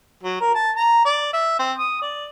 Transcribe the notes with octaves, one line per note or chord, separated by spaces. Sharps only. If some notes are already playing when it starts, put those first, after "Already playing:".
F#3
A#4
A5
A#5
D5
E5
C4
D#6
D5